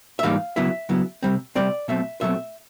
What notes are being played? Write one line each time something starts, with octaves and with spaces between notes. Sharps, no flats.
E5
G#2 E3 G3 A#3 D#4 F5
C#3 F#3 B3 E4 E5
C#3 F#3 B3 E4
C3 D#3 G3 C4
C3 D#3 G3 C4 D5
B2 F#3 A3 C4 E5
B2 F#3 A3 C4 E5